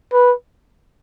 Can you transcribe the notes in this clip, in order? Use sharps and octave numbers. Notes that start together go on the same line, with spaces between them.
B4